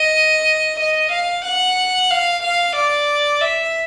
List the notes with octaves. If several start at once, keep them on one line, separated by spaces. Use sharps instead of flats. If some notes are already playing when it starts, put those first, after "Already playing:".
Already playing: D#5
D#5
F5
F#5
F5
F5
D5
E5